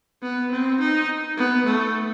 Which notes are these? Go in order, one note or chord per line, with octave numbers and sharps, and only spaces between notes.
B3
C4
D#4
B3
A3